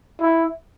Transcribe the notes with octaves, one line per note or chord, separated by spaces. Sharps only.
E4